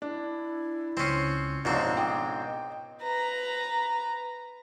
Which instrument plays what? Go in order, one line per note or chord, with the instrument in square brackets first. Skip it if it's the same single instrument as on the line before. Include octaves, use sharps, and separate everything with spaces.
[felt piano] D4 [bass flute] E4
[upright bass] C#2 [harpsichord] C4 C#4 [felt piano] C6 C7
[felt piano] F1 D4 [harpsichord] C#2 G#2 C4 [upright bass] B2 [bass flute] D#5
[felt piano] G5 D6 D#6
[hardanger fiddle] B4 A#5